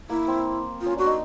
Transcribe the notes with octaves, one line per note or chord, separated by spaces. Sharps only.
A#3 E4
C4
F4
C#4
D4 F#4
D#4